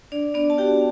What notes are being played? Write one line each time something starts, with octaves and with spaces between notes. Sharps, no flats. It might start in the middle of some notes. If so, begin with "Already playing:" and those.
D4 D5
B3 D4 D5
A5
F#4 G4 G5